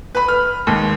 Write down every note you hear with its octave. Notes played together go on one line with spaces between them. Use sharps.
B4 B5
F6
D#2 G#2